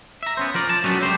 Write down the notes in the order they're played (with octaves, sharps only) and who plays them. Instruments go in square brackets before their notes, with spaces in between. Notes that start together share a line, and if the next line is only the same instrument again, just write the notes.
[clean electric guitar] E5 A#5
B3 C#4 C5
F3 A#4 D5
A5
F#3 G3 A3 B3 C#4 D4
C#2 D3 G4 A#4 C5